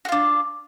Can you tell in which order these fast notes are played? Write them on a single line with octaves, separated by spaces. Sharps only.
F#4 F4 D4